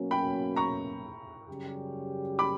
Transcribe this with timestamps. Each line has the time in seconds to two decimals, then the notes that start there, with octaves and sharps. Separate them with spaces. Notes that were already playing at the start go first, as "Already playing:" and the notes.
Already playing: B2 F#3 A#3 C#4
0.11 G5 B5
0.56 A#5 C#6
1.48 F#2 C#3 G3 C#4 G4
2.39 B5 D6